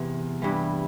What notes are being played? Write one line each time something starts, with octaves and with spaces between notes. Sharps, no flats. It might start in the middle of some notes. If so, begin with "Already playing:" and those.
Already playing: E2 C3 E3
G2 E3